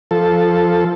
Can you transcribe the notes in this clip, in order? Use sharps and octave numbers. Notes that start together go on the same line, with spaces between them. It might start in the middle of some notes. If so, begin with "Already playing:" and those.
F3 A4